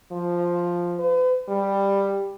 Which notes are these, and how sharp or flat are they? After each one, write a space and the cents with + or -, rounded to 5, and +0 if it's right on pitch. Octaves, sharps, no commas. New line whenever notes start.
F3 +0
B4 +45
G3 +10